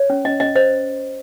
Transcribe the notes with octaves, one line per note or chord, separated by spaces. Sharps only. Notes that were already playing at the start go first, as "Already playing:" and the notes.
Already playing: C#5
C#4
C#4 D#5
C#4 D#5
C5 D#5